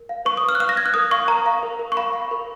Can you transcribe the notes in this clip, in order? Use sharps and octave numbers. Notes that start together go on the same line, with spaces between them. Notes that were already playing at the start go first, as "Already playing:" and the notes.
Already playing: A#4
F5
B4 C#6
D#6
B4 F6
F#6
F5 F6
A#6
B4 G#6
F#6
A#4 D#6
F5 C#6
A#4 A#5
F5
A#4
A#4
C#6
F5 B5
F5
A#4